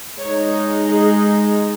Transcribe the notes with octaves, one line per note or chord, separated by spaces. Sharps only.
G#3 D#4 C#5
G#4